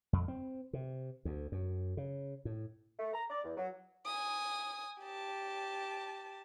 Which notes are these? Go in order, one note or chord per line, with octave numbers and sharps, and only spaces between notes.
F2
C4
C3
D2
F#2
C#3
A2
A3
A#5
D5
E2
F#3
G#5 D#6
G4 A5